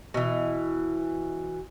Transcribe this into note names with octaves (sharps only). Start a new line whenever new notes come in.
B2 E3